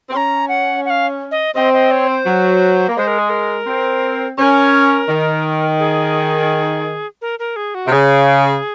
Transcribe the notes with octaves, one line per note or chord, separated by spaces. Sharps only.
C4
C#4 A#5 C6
F#5
F#5
F5
D#5
C4 D#5
D#5
C#5
C5
F#3
A#3
G#3 C5
A#4
G#4
A#4
C4
C#4 A#4 C5
D#3
G#4
A#4
A#4
G#4
F#4
C3
C#3 G#4